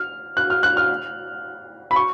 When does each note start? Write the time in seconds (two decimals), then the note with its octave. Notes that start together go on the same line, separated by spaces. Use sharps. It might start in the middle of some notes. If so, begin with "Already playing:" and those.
Already playing: F6
0.37 F#6
0.50 F6
0.63 F#6
0.77 F6
1.91 B5
1.96 C#6